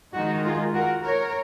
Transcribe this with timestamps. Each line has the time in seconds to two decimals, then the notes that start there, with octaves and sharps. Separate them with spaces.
0.13 D#3 G#3 D#4 F#4
0.44 F4 G#4
0.74 F#4 A#4
1.04 A#4 C#5